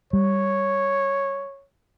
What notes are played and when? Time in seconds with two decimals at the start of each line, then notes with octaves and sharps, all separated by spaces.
0.13 G3 C#5